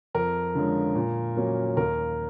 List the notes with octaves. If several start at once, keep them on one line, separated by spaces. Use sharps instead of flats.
F2 A#4
D3 F3 G#3 C#4
A#2
F#3 A#3 C#4
D#2 A#4